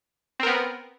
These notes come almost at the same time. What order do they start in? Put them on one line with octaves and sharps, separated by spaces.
C4 A#4 B3